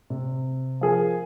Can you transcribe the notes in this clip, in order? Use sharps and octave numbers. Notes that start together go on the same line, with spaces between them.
C3
F3 G#4 A#4